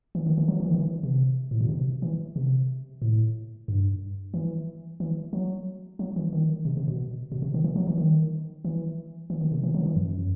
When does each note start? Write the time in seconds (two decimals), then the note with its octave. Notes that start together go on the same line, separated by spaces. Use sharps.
0.15 E3
0.27 D#3
0.38 E3
0.48 F#3
0.60 E3
0.66 D#3
0.74 E3
1.03 C3
1.51 A2
1.61 B2
1.69 C3
2.02 E3
2.36 C3
3.02 A2
3.68 G2
4.34 E3
5.00 E3
5.33 F#3
5.99 F#3
6.16 E3
6.33 D#3
6.65 C3
6.77 C3
6.88 B2
7.32 B2
7.42 C3
7.54 D#3
7.64 E3
7.76 F#3
7.87 E3
7.98 D#3
8.65 E3
9.30 E3
9.41 D#3
9.52 C3
9.63 E3
9.74 F#3
9.81 D#3
9.86 E3
9.96 F#2